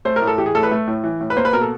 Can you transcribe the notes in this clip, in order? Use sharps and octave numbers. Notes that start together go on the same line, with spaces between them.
A3 C5
A#4
A2
A4
E3 G4
G#4
A2 A4
B4
A3
A2
E3
A2
B4
A#3 C5
B4
B2 A#4
A4